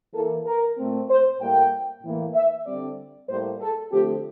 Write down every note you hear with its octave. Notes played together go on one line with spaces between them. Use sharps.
E3 A#3 A4
A#4
A#2 A3 C4
C5
A2 G3 A#3 G5
A2 E3 A#3
E5
D3 G3 C4 D5
A2 G3 A#3 C5
A4
D3 F3 A3 C4 G4